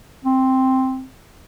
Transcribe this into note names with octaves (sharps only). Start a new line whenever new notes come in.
C4